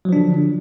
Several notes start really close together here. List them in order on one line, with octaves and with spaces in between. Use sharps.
F#3 F3 D4 D3